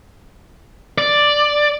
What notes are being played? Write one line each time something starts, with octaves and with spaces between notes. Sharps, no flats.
D5